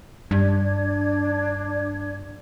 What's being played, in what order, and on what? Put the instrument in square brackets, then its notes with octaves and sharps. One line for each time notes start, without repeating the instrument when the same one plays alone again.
[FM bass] G2 [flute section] D4 D5 G#6